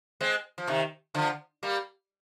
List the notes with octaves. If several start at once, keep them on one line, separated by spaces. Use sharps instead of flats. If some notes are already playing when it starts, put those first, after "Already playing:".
G#3 C4
F3
C3 D#3
D3 F3
G3 A#3